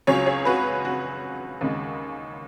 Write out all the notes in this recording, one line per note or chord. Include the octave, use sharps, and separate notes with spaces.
C#2 C#3 F#3 G#4 C#5
G#4 C#5
F#4 B4
F#4
D#2 C#3 G#3